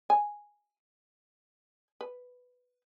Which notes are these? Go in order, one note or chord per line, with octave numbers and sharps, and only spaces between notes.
G#5
B4